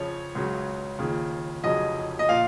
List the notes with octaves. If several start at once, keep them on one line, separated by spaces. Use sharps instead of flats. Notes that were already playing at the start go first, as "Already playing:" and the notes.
Already playing: F2 C#3 F3 C#5
C#2 C#3 F#3
D#2 C#3 F3
F1 F2 C#3 F#3 D#5
D#5
A#2 F3 F5